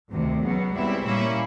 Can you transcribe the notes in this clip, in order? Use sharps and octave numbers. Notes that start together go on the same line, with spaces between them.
D2 C3 D#3
C#2 B2 F#3
C#2 B2 G3 C4 E4
A#2 G3 A#3 C#4 E4